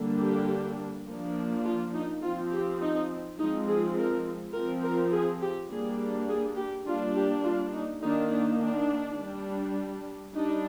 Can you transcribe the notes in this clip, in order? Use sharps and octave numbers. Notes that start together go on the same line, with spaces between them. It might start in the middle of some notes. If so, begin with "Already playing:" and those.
Already playing: D3 G3 A#3 D4
G4
F3 A#3 D4
F4
D#4
F3 C4 F4
G4
D#4
F3 G#3 C4 D#4
G#4
A#4
F3 C4 A#4
A#4
G#4
G4
G3 A#3 D4 G#4
G#4
G4
G3 A#3 D4 F4
G4
F4
D#4
D#3 A#3 D4 D#4
D4
D4
G3 D4
G3 D4 D#4